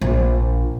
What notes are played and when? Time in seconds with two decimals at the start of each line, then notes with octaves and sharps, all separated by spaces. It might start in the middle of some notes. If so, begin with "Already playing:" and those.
0.01 A#1